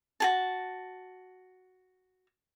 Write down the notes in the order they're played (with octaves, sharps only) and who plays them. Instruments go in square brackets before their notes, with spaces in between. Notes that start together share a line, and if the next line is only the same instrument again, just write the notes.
[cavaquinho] F#4 G#4 A5